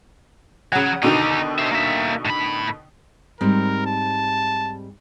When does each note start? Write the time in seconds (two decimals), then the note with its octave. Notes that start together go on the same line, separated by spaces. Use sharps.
0.72 C#3 F#3 F#5
1.03 B2 D3 D#3 D#4 G4
1.59 C5 E5
1.71 A#3 E5
2.25 A2 B5
3.41 G#2 G3 C4 A#4
3.86 A5